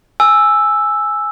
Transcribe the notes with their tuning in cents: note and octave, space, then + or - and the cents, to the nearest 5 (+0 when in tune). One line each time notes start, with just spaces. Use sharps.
G#5 +5 E6 +0